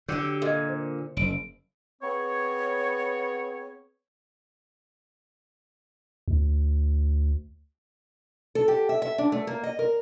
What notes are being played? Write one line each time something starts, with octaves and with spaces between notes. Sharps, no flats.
D3 F#3 F#4 G4 D6 E6 G6
A#2 A4 D#5 G#6
C5
F#1 D7
B3 C4 G#4 C#5
D2
A4
G4
E5
E5
D4
A3
A#3
D#5
A#4